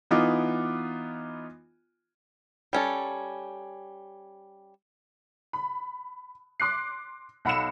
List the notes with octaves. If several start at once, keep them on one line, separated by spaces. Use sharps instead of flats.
E3 B3 D#4 F4 D6
G3 C#4 A4
B5
C6 D6 F#6 C7
B1 F#5 B5 E6 C#7 E7